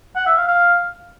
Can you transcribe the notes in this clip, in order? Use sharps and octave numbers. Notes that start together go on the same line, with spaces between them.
F#5
E5
F5
F5